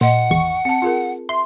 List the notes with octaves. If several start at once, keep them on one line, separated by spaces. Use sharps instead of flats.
A#2 D#5 F#5 C6
G#1 E2 C#6
C4 A5 C#7
F4 G#4 A#4
E5 C6